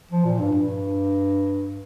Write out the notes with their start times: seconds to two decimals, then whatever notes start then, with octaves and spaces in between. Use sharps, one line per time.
0.11 F3
0.25 A#2
0.39 G2
0.53 G2